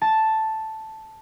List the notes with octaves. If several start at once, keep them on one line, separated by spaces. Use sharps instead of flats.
A5